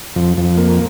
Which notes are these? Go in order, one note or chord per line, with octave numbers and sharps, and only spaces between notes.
F2
F2
A#3